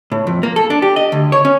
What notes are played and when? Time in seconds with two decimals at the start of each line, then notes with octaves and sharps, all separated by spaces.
0.12 A2
0.27 F2
0.43 A#3
0.56 A4
0.70 D4
0.82 G4
0.96 D#5
1.12 D2
1.32 C#5
1.45 C#4